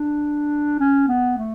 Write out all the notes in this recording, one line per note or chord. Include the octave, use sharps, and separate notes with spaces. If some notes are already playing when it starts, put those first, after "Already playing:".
Already playing: D4
C#4
B3
A3